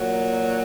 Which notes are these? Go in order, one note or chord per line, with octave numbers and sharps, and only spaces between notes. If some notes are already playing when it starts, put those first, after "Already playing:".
Already playing: A#2 F#3